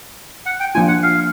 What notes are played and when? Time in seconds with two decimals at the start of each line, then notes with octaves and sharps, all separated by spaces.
0.46 F#5
0.60 G5
0.74 F3 A#3 D4 F4 G#5
0.88 F#5
1.03 F5